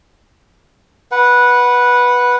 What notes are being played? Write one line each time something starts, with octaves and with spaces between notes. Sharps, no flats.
B4 F#5